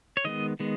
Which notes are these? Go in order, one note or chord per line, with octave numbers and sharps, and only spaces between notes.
C#5
D#3 G#3 B3 D#5
D#3 G#3 B3